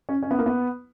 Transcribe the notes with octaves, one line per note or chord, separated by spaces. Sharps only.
C#4
C#4
B3
A#3
B3